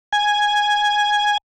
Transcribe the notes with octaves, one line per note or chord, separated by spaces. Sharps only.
G#5